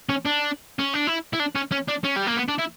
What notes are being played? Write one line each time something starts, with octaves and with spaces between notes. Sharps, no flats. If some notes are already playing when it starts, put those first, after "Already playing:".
C#4
D4
C#4
D4
E4
E4
D4
C#4
C#4
D4
C#4
G3
A#3
B3
D4
E4